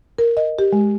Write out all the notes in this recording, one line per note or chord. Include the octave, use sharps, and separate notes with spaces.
A#4
D#5
G4
G#3